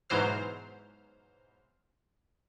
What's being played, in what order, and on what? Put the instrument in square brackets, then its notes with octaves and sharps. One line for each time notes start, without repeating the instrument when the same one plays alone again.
[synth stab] G#2 B2 E3 F#3 C5 F6